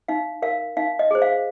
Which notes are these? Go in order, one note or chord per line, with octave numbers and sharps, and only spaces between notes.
D#4 F5
A#4 F5
D#4 F5
D#5
G#4 C5
F5